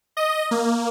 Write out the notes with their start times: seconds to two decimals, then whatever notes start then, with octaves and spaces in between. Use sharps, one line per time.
0.17 D#5
0.51 A#3